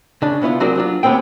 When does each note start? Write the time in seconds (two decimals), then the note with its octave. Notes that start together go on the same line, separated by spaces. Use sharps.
0.22 C#3 D4
0.42 C3 B3 E4 F4
0.60 F#3 C4 F#4 G#4 A#4 D5
0.75 F#3 D4 F4
1.03 D#2 G#3 B3 C4 G5